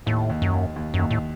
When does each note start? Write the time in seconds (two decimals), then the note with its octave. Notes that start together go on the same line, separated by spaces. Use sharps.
0.06 D#2 A2
0.30 D#2
0.42 F#2
0.53 D#2
0.76 D#2
0.94 F#2
0.99 D#2
1.10 A2